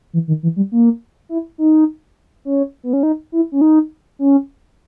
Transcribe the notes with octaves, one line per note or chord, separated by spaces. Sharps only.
E3
D#3
E3
G3
A#3
E4
D#4
C#4
B3
C#4
D#4
E4
C#4
D#4
C#4